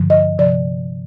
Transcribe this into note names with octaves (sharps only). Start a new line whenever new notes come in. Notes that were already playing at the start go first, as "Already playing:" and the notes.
Already playing: G2 D3 F3
D#5
C3 F3 D5